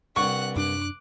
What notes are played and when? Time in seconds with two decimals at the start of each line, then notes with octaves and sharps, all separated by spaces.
0.16 C2 G2 F#5 C#6 F#6
0.56 F#2 D4 D6 F#6